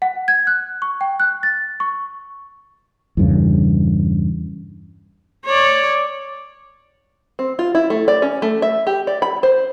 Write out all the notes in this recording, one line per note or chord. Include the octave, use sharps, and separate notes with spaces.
F#5
G#6
F#6
C#6
G5
F#6
A6
C#6
E2 G2 C#3
C#5 D5
C4
F4
E4
A3
D5
C#4
A3
E5
G4
D5
B5
C5